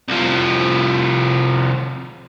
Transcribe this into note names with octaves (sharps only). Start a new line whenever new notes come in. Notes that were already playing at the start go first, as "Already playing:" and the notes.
C2 F3